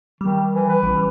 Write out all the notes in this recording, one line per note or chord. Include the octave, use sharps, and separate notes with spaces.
D#3 G3
E3
B4
A1 E3
G3